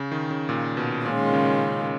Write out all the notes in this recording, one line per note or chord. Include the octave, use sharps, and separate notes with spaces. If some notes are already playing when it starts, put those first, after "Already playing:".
Already playing: C#3
D#3
C#3
A#2
B2
A#2 D#3 G#3 C#4 F4
C#3